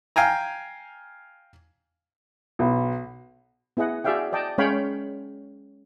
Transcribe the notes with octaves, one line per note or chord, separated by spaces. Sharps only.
F5 G5 G#5 A#5
B1
B3 E4 G#4 D#5 F#5
F#4 G#4 D5 E5 F5 G5
D5 D#5 G5 A5
G#3 C#4 C#5 F5 G5 B5